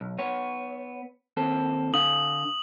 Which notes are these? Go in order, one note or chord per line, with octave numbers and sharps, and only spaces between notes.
B1
B3 C#5
D#2 C4 A4
D3 F5 D#6 F#7